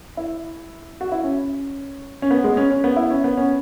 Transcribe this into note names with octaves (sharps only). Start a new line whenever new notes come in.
E4
F#4
E4
C#4
C#4
B3
G#3
C#4
C#4
B3
E4
C#4
B3
C#4